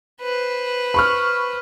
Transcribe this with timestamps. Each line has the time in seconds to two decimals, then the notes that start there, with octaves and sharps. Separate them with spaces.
0.22 B4 C5
0.94 B5 C#6 F6